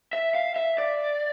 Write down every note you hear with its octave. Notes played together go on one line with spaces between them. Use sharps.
E5
F5
E5
D5